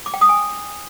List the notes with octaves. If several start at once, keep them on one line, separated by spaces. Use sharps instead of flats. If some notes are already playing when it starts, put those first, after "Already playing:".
D6
G5
D#6
G#5